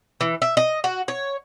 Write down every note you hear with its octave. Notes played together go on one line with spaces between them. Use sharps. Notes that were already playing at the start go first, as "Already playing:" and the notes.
E3
E5
D#5
F#4
C#5